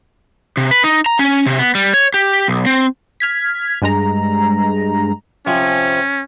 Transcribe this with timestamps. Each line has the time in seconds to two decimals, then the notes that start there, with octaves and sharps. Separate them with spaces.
0.57 C3
0.71 B4
0.84 D#4
1.06 A#5
1.19 C#4
1.46 C3
1.59 B3
1.75 G3
1.94 C#5
2.14 G4
2.48 B1
2.66 C4
3.20 F6 G#6 B6
3.82 G2 G#3 A#5
5.47 C3 F3 C#4 G#5